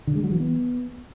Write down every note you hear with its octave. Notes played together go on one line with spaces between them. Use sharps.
D3
G#3
F#3
E3
B3